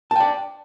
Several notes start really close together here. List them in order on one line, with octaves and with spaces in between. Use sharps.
A5 G5 D5